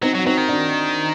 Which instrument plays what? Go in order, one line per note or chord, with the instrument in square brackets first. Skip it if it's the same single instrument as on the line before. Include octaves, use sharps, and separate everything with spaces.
[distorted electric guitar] F#3 [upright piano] C4 D#4
[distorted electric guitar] F#3
[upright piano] F#4
[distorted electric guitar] F#3 [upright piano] C4 D#4
[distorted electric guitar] D#3
[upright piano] D4 F#4